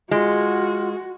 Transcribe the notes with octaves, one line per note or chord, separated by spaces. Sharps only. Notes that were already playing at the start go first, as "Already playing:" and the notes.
G#3 F4 F#4